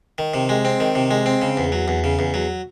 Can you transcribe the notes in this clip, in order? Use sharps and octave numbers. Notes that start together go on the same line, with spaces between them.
D#3
C3
G#3
C4
D#3
C3
G#3
C4
C#3
E2
F#3
E2
C#3
E2
F#3